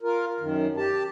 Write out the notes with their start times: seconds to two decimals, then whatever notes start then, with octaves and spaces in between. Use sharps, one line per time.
0.01 F4 A#4
0.40 F#2 D#3
0.77 G4 A5